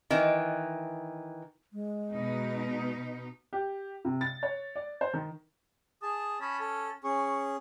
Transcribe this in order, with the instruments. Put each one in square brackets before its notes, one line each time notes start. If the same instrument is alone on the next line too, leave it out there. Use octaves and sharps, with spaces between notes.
[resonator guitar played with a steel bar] D#3 E3
[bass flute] G#3
[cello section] B2 D#4
[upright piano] G4
C3
A6
C#5
D5
C5
D#3
[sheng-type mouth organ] G#4 A5 [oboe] D#6
[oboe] C#4 [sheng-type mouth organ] A5 B5
[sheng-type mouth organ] A4
[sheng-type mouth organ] C#4 G#4 [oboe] C#6